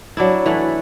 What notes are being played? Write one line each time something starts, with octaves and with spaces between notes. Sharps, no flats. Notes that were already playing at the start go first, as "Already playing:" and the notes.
F#3 D4 E4
E3 A3 F#5